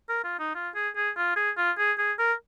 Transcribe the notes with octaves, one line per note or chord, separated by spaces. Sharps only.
A#4
F4
D#4
F4
G#4
G#4
F4
G#4
F4
G#4
G#4
A#4